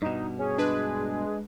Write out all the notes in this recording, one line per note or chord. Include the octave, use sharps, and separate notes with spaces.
G2 B2 D#4
C#4 G#4
G#3 D4 B4